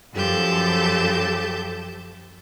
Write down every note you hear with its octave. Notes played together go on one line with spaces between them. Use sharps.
F#2 F3 G4 A4 A5 G6